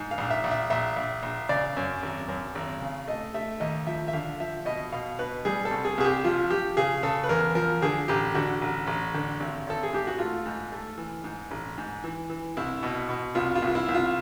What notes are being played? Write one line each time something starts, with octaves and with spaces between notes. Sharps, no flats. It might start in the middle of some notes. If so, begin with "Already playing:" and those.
Already playing: G#2
F5
A#1
E5
A#1
E5
A#1 E5
A#1
A#1
C#3 D5
F#2
G#1
F#2
G#1
C#3
A3 D#5
A3 E5
D#2 D#5
F3 E5
E5
D3 F5
F3 E5
B2 D#5
B2 F5
B2 B4
G3 G#4
A4
C2
G#4
C2 G#4
G4
F3 F4
F3 G4
C#3 G#4
C#3 A4
B4
E2 A#4
F3 A#4
D3 G#4
A1 G4
D3 F#4
A1
A1
D3
G#1
G#1 A4
G#4
G#2 G4
F#4
A3 F4
G#2
A3
E3
G#2
A1
G#2
E3
E3
C2 E4
B2
B2
C2 F4
F4
C2
F4
E4
C2
F4